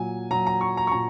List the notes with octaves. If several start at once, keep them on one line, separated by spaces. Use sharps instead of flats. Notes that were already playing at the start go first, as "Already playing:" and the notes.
Already playing: A#2 F#3 G#5
A#2 F#3 A#5
A#5
C#6
A#5
C#6
A#2 A#5